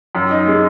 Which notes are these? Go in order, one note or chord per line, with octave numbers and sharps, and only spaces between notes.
F#2
D#4
G#3